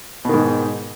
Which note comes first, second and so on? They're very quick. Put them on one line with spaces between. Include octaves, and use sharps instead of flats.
B2 D#3 G#2